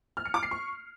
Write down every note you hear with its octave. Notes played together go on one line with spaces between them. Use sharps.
F6
C#7
D6
C7
C#6